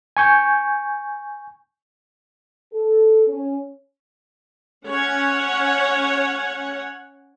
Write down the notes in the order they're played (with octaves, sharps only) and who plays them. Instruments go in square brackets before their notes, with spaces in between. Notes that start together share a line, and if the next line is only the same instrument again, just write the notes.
[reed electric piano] G#5 C#6 G6
[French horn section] A4
C#4
[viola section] C#4 C#5 F#5